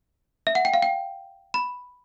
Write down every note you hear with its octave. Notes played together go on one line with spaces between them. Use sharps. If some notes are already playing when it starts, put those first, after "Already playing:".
E5
F#5
G5
F5
G5
B5